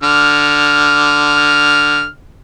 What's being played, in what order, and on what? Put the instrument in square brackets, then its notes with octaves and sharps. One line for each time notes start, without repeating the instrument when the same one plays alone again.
[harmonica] D3 F6